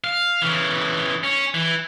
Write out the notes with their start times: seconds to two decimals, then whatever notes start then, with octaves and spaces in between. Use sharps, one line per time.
0.04 F5
0.42 C#3 E3
1.23 C#4
1.54 E3